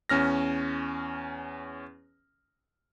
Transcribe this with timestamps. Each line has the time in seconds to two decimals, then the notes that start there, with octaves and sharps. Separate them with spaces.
0.09 E2 C#4 F6 A#6